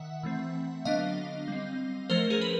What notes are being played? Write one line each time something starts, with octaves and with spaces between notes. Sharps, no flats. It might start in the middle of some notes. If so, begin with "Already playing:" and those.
Already playing: D#3 E5 F#5
E3 A3 C4
D3 F#3 B3 D4 D#5 F5
G3 C4
F3 A3 C#4 A#4 C5
G#4 A#4
B4